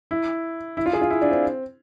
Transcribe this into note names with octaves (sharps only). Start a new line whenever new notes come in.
E4
E4
F4
G#4
F4
E4
D4
C4